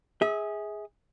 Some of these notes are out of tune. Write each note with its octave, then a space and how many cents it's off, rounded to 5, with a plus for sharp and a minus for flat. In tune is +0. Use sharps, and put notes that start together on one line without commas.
G#4 +0 E5 -35